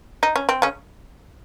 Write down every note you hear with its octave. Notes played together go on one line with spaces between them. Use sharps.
D#4
C#4
C4
C#3 C#4